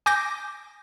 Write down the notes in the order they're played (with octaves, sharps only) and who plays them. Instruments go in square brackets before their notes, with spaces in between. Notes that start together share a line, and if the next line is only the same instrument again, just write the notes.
[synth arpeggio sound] G#5 D6 G6 A#6